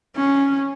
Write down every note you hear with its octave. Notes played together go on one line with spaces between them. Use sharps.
C#4